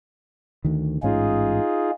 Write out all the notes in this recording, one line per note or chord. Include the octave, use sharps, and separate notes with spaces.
D2 D#3
A1 G#2 C#4 D#4 F4 G#4